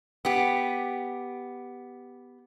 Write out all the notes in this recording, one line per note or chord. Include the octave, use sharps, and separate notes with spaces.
B3 G4